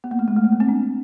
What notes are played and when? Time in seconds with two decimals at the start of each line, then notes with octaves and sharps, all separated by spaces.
0.04 B3
0.11 A#3
0.19 A3
0.28 G#3
0.36 A3
0.44 A#3
0.52 B3
0.60 C4
0.69 D4